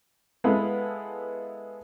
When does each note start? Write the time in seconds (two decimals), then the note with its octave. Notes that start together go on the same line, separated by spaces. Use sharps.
0.44 G#3 B3 E4 A4 B4 F5